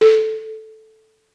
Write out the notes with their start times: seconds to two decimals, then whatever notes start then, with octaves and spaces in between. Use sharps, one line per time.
0.01 A4